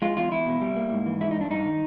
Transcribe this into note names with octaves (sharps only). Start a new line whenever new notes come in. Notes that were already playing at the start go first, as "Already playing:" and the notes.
G#3 F4
E2 F4
E2 E4
B2
G3
A#3
G#2
E3
G#3 E4
D#4
G2
D4
G2 D#4
D#3